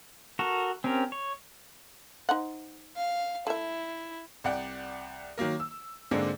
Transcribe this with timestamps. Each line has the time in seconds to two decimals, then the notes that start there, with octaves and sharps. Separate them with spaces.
0.39 F#4 A4 A#4
0.84 C4 C#4 G4 A#4
1.12 C#5
2.29 D#4 C5 F#5
2.97 F5
3.47 A3 E4 E5
4.44 C2 D5 F#5 G5
5.38 D#3 F#3 A#3 A#4
5.60 E6
6.11 G#2 D3 G#3 A#3 C4 D4